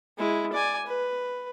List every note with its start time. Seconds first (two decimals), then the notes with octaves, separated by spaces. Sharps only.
0.18 G#3 E4
0.53 D5 G#5
0.87 B4